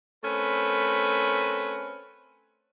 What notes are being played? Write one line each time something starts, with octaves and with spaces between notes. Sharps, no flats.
A3 C4 C#4 A#4 B4